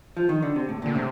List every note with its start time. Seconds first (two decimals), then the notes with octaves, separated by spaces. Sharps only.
0.17 F3
0.29 D#3
0.42 D3
0.56 C3
0.69 A2
0.82 A#2 D3
0.95 A2 C3